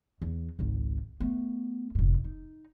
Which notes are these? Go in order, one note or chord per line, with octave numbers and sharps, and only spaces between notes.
E2 E3
G#1 C#2
A3 B3
F1 G#2
D#4